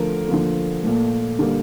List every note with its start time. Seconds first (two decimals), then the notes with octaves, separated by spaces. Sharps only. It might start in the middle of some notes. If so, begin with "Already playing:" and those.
Already playing: D3 F3 A3 A#4
0.29 D3 F3 A#3
0.83 A#2 A3
1.39 D3 G3 A#3